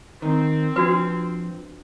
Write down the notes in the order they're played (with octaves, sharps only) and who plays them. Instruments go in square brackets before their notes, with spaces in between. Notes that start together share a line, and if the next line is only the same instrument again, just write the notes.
[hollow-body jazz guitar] D#3 [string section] C4
[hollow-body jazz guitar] F3 [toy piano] D4 F#4 B4